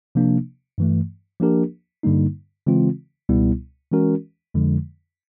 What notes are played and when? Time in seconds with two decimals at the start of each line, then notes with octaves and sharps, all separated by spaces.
0.15 C3 F3 A#3 D4
0.78 G2 E3 A3
1.40 F3 A#3 D4 G4 A#4
2.03 G2 D3 G3 A#3 D#4
2.67 C#3 E3 G#3 C4 F4
3.29 C#2 B2 G3 B3 E4
3.92 E3 G#3 C#4 F#4 A#4
4.54 F2 D3 F3 G#3